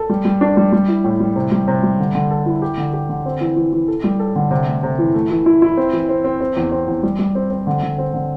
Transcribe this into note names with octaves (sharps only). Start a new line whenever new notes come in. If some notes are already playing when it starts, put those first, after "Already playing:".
Already playing: A4
G3
G3
D4
G3
G3
E4
A2
G3
C3
G3
C3
G3
D3
D3
A4
E4
G4
D3
G4
D3
C4
E3
E3
E3
A4
G3
A4
D3
C3
A3
C3
E3
A3
E3
E4
E4
C4
E3
C4
C4
C4
E2
C4
E2
G3
G3
C4
C4
D3
D3
C4
D3